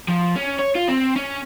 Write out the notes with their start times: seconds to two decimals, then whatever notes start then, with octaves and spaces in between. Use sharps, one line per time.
0.08 F3
0.36 C#4
0.59 C#5
0.75 F4
0.88 C4
1.16 C#4